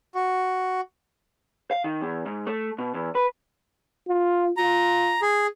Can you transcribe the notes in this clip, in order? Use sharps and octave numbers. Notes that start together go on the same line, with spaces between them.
F#4
F5
D#3
E2
G#2
A3
B2
E2
B4
F4
F4 A#5
G#4